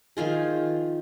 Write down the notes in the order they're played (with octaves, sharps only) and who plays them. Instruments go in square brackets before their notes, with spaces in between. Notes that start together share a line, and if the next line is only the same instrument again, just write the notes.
[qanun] D#3 F3 F4 G#4